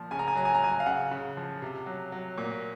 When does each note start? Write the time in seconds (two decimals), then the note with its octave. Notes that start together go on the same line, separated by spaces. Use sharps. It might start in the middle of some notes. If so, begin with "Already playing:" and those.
Already playing: A#2 F3
0.11 C#3 G#5
0.19 A#5
0.28 G#5
0.35 F#3 A#5
0.45 G#5
0.54 A#5
0.61 F#3 G#5
0.80 F5
0.86 C#3 F#5
1.11 C#3
1.37 F3
1.62 C3
1.86 F#3
2.12 F#3
2.38 A#2